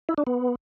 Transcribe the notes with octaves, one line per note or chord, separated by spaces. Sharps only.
E4
D4
B3